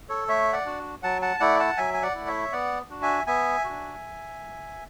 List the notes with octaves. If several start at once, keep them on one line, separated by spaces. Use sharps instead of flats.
A4 C#5
A3 C#5 E5
D5 F#5
D4 F#4
F#3 F#5 A5
F#5 A5
A3 E4 D5 F#5
F#5 A5
F#3 E5 G#5
G#5
D5 F#5
A3 E4
C#5 E5
B3 D5 F#5
D4 F#4
E5 G#5
B3 E5 G#5
D4 F#4